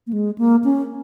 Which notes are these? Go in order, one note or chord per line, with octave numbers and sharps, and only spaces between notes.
A#3
G#3
A#3
C#4